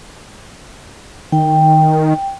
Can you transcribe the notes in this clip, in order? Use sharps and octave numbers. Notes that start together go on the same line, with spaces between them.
D#3 G5